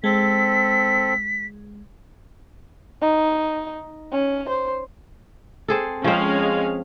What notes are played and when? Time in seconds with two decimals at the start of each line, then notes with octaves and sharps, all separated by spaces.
0.04 G#3 C4 A4 B6
3.01 D#4
4.12 C#4
4.49 C5
5.68 C4 G#4 A4
6.04 F3 G#3 C4 C#4 F5